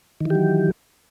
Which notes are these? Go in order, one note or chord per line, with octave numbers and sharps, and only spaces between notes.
D#3 E3 F#3 G4